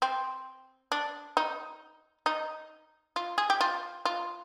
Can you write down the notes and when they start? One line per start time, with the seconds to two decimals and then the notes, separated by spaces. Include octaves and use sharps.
0.02 C4
0.92 D4
1.37 D#4
2.26 D#4
3.16 F4
3.38 G#4
3.50 G4
3.61 F4
4.05 F4